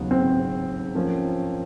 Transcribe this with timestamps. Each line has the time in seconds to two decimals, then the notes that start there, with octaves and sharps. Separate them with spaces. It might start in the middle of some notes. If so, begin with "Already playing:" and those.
Already playing: D#2 C#3 F#3 B3 D#4
0.11 C4
0.95 F3 A#3 C#4